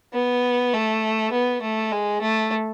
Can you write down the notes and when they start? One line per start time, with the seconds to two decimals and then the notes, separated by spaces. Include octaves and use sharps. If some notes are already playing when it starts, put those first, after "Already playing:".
0.14 B3
0.73 A3
1.32 B3
1.62 A3
1.92 G#3
2.21 A3